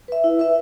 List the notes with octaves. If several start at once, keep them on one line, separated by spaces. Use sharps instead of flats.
B4 E5
E4
B4 E5